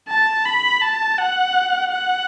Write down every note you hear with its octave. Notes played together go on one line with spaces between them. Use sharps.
A5
B5
A5
F#5
F#5